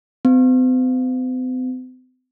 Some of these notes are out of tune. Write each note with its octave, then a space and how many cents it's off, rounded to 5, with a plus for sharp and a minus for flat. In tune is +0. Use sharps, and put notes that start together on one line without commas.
C4 -45